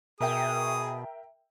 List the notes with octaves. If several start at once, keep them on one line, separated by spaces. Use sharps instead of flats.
B2 G#4 A#4 E5 G5 D#6